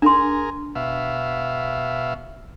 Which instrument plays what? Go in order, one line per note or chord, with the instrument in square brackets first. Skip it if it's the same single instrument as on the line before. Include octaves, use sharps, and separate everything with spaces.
[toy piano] D4 C6 [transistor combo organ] G#4 A#4
[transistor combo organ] B2 E5 F5